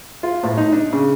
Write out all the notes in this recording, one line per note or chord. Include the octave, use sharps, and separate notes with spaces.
F4
A2
D#4
D4
C#3